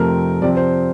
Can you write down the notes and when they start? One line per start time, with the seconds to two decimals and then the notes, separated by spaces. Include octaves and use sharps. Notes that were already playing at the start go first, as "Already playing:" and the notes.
Already playing: F2 C3 F3 A3 C4 A#4
0.42 C3 F3 C4 D5
0.57 C5